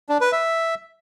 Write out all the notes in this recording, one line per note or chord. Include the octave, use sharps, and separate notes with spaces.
D4
B4
E5